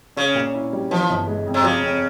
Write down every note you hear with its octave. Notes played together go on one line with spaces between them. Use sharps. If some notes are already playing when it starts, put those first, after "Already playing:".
C#3 C#4
A#2
E4
G3
E3 F3
G1
G#3
F2
C3
C#3 F3
F2